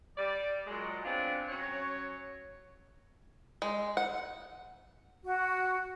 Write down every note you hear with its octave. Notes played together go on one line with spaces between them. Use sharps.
G3 D5
A#2 F#3 G#3
B3 C4 D4 F4 G#4
F#3 C#4 C#5
G#3
F#5
F#4